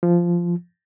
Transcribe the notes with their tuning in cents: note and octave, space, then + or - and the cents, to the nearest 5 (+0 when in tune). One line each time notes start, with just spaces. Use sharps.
F3 -10